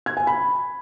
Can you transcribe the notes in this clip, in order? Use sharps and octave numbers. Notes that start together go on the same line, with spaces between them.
G#6
G#5
B5